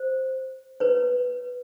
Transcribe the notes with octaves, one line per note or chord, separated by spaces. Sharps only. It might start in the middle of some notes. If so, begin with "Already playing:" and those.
Already playing: C5
B4 C#5